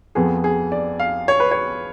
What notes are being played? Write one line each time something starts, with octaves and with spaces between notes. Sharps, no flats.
F2 F3 B3 G#4
G#4
D5
F5
C#5
B4
C#5